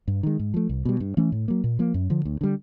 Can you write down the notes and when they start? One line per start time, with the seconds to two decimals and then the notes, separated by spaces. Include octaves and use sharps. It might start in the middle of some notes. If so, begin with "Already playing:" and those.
0.08 G2
0.23 D#3 G#3
0.39 G#2
0.54 F3 A3
0.69 C2
0.85 B2 G3
1.00 G2
1.17 E3 A3 C#4
1.32 A2
1.48 F#3 A#3
1.64 A#2
1.79 F3 A#3
1.94 F#2
2.10 D3 F3
2.25 D2
2.41 D3 G3